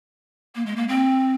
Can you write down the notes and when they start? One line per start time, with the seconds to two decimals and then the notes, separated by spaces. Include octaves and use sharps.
0.55 A#3
0.66 G#3
0.76 A#3
0.89 C4